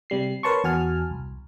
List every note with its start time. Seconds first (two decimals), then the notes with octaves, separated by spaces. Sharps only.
0.10 C3 G3 C7
0.43 A#4 B4 C#5 A5 C6 C#6
0.64 E2 F#4 G#5 A5 F6
1.11 C2